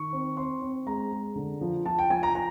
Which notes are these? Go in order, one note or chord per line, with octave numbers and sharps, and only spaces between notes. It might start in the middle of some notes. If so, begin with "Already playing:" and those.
Already playing: D#3 C#6
C4
C4 C6
C4
G#3 A#5
G#3
D3
F3
F3 A5
G5
F3 G#5
A#5
A#5